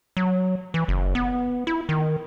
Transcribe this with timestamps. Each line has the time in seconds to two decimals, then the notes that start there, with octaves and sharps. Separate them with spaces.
0.17 F#3
0.74 E3
0.88 F#1
1.15 B3
1.67 E4
1.89 D#3